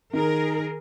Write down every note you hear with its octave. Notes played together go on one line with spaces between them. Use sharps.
D#3 G#4 A#4